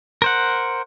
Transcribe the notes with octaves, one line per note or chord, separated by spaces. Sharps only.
A#4 C5 F#5